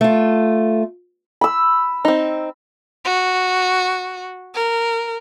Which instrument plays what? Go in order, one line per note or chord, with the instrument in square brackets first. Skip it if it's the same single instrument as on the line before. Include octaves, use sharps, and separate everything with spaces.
[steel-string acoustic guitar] A3 F4
[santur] B5 E6
[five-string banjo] C4 D#4
[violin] F#4
A#4